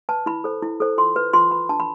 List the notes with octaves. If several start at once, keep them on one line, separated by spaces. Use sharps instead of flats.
B4 A5
E4 B5
A4 C5
E4
A4 C5
F4 C6
B4
F4 C6
B4 B5
D4 A5
B5